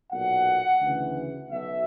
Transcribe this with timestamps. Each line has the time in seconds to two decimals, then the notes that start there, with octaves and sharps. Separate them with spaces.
0.11 B1 A#2 F#5
0.81 D2 C#3 E3
1.50 B1 B2 E5